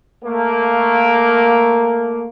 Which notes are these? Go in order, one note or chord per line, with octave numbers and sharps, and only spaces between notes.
A3 A#3